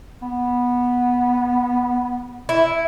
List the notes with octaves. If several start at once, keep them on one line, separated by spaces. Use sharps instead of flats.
B3
E4